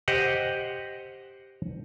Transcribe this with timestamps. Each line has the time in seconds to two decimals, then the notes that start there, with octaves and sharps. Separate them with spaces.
0.08 G4 C5 D#5 F#5